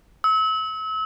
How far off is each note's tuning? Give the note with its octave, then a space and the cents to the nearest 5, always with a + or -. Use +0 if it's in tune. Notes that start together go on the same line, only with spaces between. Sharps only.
E6 -35